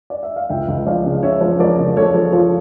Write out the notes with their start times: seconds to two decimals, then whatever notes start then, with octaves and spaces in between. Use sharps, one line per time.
0.10 D5
0.23 E5
0.36 F5
0.50 C#2 E5 G5
0.68 C#2
0.86 F3 D5 F5
1.04 C#3
1.23 C#4 C#5 E5
1.41 F3
1.59 F3 A#4 D5
1.78 C#3
1.97 F3 A4 C#5
2.14 F3
2.32 F3 F4